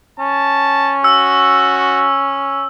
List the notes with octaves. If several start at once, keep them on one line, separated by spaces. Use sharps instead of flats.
C#4 A5
F#4 E6